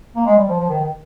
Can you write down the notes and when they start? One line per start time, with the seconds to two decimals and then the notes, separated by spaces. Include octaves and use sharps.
0.16 A#3
0.26 G#3
0.37 G3
0.49 F3
0.60 F3
0.70 D#3
0.81 D#3